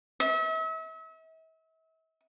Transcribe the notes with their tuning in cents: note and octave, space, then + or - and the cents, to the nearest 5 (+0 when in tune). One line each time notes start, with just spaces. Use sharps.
E5 -40